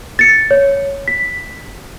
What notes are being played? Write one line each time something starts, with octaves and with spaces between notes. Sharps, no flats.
A6 C#7
C#5
B6